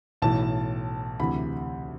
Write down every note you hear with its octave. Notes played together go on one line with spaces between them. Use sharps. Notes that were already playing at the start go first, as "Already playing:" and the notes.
B1 A2 E3 A5
D2 C3 E3 B5